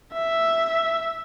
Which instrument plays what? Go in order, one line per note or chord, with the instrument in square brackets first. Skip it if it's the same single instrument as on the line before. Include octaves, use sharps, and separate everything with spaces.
[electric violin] E5